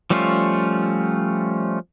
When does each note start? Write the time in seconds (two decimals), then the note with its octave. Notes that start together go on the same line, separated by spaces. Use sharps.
0.10 F3 G3 A3 C#4 F4